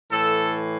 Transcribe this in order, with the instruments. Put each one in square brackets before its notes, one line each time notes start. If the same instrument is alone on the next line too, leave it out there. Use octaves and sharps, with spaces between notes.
[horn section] A2 E3 A4